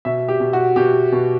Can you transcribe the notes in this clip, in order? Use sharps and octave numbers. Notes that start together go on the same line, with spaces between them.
B2 E5
G4
B2
F#4
B2 G4
B2